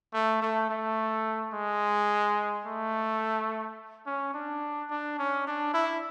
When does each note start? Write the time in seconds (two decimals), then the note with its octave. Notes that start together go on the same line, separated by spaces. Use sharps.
0.13 A3
0.42 A3
0.69 A3
1.53 G#3
2.66 A3
4.06 C#4
4.34 D4
4.90 D4
5.18 C#4
5.47 D4
5.74 E4